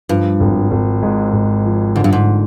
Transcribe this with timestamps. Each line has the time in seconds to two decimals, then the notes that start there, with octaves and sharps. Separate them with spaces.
0.09 G2 F3
0.40 G#1
0.71 G#1
1.03 G#2
1.33 G#2
1.65 F3
1.96 G#2 D3
2.04 G2
2.13 G#2